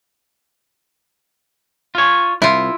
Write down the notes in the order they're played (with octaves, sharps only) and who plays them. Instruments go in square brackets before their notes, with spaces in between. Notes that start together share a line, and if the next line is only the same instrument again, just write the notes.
[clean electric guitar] F4 C#5
[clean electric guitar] C2 [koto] E4 F4